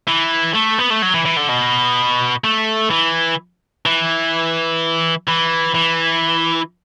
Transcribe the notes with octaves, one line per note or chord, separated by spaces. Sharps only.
E3
A3
B3
A3
F#3
E3
E3
D3
B2
A3
E3
E3
E3
E3